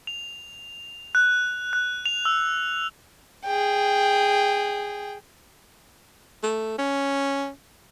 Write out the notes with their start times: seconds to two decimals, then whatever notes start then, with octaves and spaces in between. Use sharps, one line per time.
0.07 F7
1.15 F#6
1.73 F#6
2.06 F7
2.25 E6
3.45 G#4 G5
6.43 A3
6.78 C#4